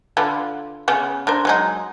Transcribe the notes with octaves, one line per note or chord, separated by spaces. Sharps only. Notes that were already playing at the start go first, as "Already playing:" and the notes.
D3 F4 B4
C#3 B3
D4 A#4 C5
F#3 G#3 D#4